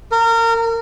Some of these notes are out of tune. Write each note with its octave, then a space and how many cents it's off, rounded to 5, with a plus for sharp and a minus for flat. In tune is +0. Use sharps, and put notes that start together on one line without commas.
A#4 -25